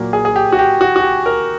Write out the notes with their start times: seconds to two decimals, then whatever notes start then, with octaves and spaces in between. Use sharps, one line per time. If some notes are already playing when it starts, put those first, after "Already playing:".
Already playing: A#2 F#3 A#3
0.13 G#4
0.25 G#4
0.36 G4
0.52 F#4
0.59 G4
0.81 F#4
0.96 F#4
1.03 G4
1.26 A#4